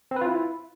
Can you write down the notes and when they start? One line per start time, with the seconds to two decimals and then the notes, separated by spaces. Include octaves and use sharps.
0.11 C4
0.16 B4
0.21 F4
0.26 E4